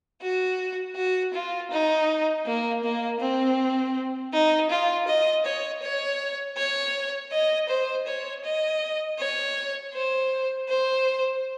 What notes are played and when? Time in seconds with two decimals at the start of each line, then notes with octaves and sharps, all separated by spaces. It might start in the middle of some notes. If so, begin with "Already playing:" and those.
0.22 F#4
0.96 F#4
1.34 F4
1.71 D#4
2.46 A#3
2.84 A#3
3.20 C4
4.33 D#4
4.70 F4
5.08 D#5
5.45 C#5
5.82 C#5
6.57 C#5
7.32 D#5
7.69 C5
8.07 C#5
8.44 D#5
9.19 C#5
9.94 C5
10.69 C5